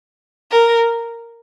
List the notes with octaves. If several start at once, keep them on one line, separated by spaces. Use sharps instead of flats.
A#4